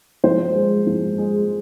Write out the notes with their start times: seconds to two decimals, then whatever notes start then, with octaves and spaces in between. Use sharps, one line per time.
0.24 F3 C5
0.55 G#3
0.87 F3
1.18 G#3